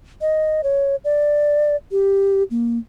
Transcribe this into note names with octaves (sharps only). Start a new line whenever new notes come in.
D#5
C#5
D5
G4
A#3